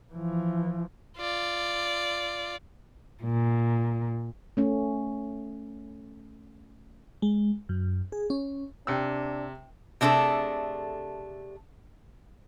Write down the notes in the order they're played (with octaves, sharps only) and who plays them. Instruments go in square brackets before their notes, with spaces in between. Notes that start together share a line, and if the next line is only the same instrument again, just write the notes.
[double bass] E3 F3
[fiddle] F4 D5
[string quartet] A#2
[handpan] A3 C#4
[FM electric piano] G#3
F#2
G#4
C#4
[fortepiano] C3 E6 [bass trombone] D4 [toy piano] C5 G5
[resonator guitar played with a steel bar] C3 A3 D4 G#4 A4